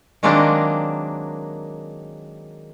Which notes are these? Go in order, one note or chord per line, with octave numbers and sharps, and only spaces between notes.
D#3 F#3 G#3 A#3 C4 D4